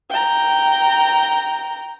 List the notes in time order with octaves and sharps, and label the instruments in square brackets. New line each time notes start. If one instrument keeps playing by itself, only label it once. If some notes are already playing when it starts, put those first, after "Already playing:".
[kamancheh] G5 A#5